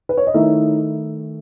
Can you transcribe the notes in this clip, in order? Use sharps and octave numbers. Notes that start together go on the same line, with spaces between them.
B4
C#5
D#5
D#3 A3 D#4 E4 E5